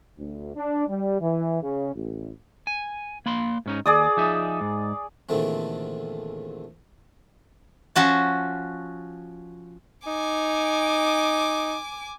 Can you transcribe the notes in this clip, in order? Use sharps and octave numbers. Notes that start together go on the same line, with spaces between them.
D2
D4
G3
E3
C#3
A1
G#5
A#3 B5 C6
G#2 C#4 D#4
D#2 G#4 D5 D#6
F3 D#4 E5
G#2
E2 A#2 D3 D#3 A3 C4
F3 C#4 F#4 A5
D#4 G#5 D6